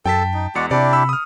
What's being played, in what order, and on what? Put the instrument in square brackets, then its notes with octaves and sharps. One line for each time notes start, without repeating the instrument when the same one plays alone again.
[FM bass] F#2 [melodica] A4 [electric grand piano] G5 A5 B6
[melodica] D#4
[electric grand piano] E2 C#7 [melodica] G#3 F#4 D5
[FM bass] C3 [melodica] D4 E4 G4 [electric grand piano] D5
[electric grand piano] B5 E6
D#6 F6